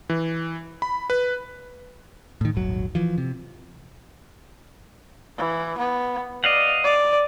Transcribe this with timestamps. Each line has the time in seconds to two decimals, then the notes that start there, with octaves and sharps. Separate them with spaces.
0.10 E3
0.82 B5
1.10 B4
2.41 A2 D#3
2.55 D#1 G#1 F#3
2.95 E3 F3
3.18 C3
5.38 E3
5.78 B3
6.44 D5 D#5 F5 F#5
6.84 D5